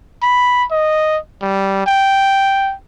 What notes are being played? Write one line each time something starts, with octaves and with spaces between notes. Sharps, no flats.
B5
D#5
G3
G5